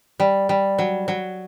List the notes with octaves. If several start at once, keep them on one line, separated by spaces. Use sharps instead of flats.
G3
G3
F#3
F#3